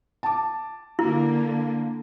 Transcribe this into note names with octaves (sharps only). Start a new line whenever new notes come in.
A5 D6
D3 A#3 E4